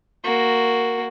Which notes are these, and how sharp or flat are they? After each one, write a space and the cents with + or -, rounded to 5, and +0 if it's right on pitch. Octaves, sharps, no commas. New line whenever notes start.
A#3 +0 F#4 +0